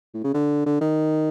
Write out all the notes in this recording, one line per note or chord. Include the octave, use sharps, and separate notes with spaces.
A2
C#3
D3
D3
D#3